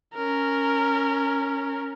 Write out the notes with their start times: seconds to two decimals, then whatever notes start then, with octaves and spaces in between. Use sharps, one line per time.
0.15 C#4 A#4